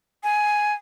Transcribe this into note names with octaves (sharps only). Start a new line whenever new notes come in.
G#5